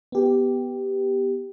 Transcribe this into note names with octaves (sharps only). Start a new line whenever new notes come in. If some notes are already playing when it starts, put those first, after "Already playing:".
B3 G4